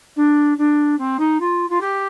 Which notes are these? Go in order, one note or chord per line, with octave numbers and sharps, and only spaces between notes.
D4
D4
C4
D#4
F4
F4
G4